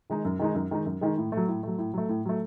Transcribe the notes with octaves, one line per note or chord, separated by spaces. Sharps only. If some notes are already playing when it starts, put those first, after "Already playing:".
D#3 G#3 D#4
F#2
D#3 G#3 D#4
F#2
D#3 G#3 D#4
F#2
D#3 G#3 D#4
A2
F#3 A3
A2
F#3 A3
A2
F#3 A3
A2
F#3 A3